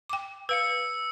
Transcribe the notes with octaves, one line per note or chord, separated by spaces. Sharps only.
G5 D6
B4 F5 E6 C#7